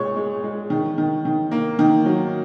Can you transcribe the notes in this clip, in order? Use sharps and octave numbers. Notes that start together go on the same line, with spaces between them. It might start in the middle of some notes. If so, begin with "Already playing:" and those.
Already playing: A#2 G#3 C#5 C#6
G#3
G#3
D#3
D#3
D#3
A#3
D#3
F#3